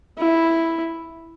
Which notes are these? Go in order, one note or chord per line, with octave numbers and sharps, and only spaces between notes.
E4